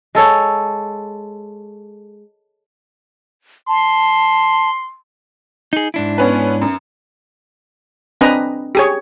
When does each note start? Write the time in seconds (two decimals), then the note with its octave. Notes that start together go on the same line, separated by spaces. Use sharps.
0.15 G#3 A4 C#5
3.68 A5 C6
5.73 D#4 G#4
5.94 G#2 D4 E4
6.18 B3 C#4 B4
6.61 F#2
8.21 C4 D4 B4 D#5 G#5 A#5
8.75 G4 G#4 C#5